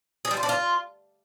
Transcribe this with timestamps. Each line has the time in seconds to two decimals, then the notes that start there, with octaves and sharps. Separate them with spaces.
0.25 G#4
0.31 G3
0.37 F4
0.43 D4
0.49 F4